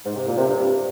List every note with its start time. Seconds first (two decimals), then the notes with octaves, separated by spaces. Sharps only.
0.05 G#2
0.15 C3
0.26 A#2
0.37 C3
0.47 G2